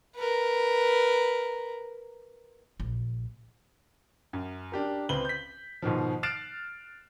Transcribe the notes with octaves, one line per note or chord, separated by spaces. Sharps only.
A#4 B4
A#1
F#2
D4 G4 A#4
C#2 C4 B4 F#7 G7
G6 B6
G#2 B2 D#3 F3
F6 F#6 A6 C7 D7 E7